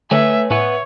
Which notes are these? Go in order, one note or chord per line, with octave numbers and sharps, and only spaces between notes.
D3 A3 B4 C#5 E5 G#5
A2 B4 C#5 E5 F#5 G#5 C#6